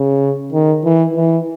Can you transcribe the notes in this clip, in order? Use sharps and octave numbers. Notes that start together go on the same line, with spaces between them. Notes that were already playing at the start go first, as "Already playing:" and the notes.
Already playing: C#3
D#3
E3
E3